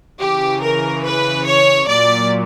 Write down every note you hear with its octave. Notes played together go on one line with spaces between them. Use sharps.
C#3 E3 G4
A#4
B4
C#5
A#2 F#3 D5